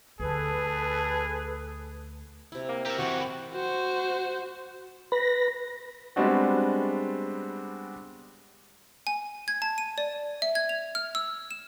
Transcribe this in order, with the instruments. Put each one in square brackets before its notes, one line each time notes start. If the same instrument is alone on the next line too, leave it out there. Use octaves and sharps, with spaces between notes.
[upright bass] D2 [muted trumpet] G#4 [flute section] A4 B4
[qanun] C3 E4
[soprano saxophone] A#3
[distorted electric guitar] G4 E5 [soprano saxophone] A#4
[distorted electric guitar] C3 E3 [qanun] C4 E4 G4 [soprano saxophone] F#4
[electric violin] F#4 C5
[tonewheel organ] B4 B5 A#6
[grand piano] G3 G#3 B3 C4 D4 F#4
[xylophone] G#5
G#6
A5
D#7
D5
E5
G#6
F7
F6
E6
E7